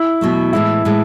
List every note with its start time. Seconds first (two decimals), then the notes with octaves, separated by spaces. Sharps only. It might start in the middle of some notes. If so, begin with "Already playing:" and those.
Already playing: E4
0.21 E2 B2 F#3 A3
0.53 A2 E3 G#3 E4
0.85 A2 E3 G#3